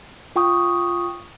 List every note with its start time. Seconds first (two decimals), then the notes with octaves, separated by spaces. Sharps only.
0.36 F4 G5 C#6 D#6